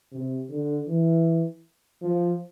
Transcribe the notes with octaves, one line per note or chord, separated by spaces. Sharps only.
C3
D3
E3
F3